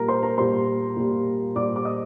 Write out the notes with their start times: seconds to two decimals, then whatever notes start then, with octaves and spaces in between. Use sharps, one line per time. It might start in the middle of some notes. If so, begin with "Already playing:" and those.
Already playing: A#2 G3 A#4 A#5
0.08 C5 C6
0.23 A#4 A#5
0.37 A#2 G3 C5 C6
0.96 A#2 G3
1.56 A#2 G3 D5 D6
1.76 D6
1.85 D#5 D#6